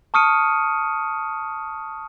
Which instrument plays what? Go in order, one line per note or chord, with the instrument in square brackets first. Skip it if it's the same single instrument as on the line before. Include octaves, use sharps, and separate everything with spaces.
[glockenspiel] A5 C#6 D#6 F6 C#7 D#7